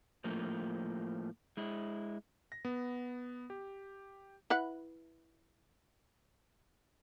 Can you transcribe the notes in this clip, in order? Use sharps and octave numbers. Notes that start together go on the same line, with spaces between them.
A2 F3 A3 A#3
G#3 E4
A#6
B3
G4
E4 B4 F#5